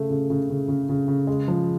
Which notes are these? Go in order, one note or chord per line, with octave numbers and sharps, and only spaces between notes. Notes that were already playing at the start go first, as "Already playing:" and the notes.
Already playing: C#3 A3
C#3
C#3
C#3
C#3
C#3
C#3
G#3
F3